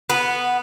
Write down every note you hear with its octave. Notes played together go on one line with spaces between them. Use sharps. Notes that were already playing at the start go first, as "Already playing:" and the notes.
B3